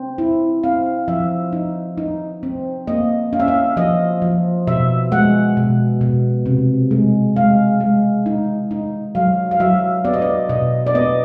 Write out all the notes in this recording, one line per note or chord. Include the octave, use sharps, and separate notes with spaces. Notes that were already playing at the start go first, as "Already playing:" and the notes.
Already playing: C4
E4
C4 F5
F3 E5
D#4
D#4
C4
A#3 D#5
C#4 F5
E5
F5
F3 D#5
F3
B2 E5
G#3 F#5
B2
B2
C3
G#3
G#3 F5
G#3
D#4
D#4
F#3 F5
F5
F#3 E5
B3 D5
D#5
D5
B2 D#5
D5
B3 D#5